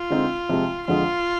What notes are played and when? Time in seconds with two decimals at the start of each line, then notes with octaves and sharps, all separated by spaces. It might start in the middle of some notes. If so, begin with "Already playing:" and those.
Already playing: F4
0.10 D3 G#3 C4 D#4
0.49 C3 F3 G#3 C4
0.88 F2 D3 G#3 D4 F4